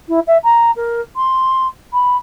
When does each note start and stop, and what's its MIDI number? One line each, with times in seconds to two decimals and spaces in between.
0.08 0.20 64
0.27 0.38 76
0.44 0.71 82
0.76 1.01 70
1.16 1.67 84
1.93 2.17 83